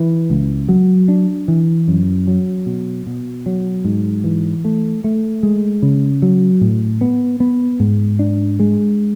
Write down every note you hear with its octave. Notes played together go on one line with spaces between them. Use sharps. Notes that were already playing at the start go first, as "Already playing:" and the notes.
Already playing: E3
C#2
F#3
D4
E3
F#2
F#3
B2
B2
F#3
G#2
E3
A3
A3
G#3
C#3
F#3
A2
B3
B3
G#2
D4
G#3